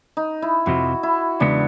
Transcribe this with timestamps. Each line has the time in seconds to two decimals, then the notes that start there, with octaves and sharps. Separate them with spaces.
0.17 D#4
0.42 E4
0.66 F2 C3 F3 F#4
1.03 E4
1.40 E2 C#3 G#3 B3 D4